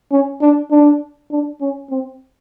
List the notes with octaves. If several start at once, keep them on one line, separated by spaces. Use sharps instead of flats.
C#4
D4
D4
D4
C#4
C4